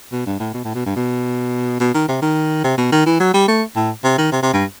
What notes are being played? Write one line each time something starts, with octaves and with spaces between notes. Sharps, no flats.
B2
G2
A2
B2
A2
B2
G2
B2
B2
D#3
C3
D#3
C3
B2
D#3
E3
F#3
G3
A3
A2
C3
D#3
C3
C3
G2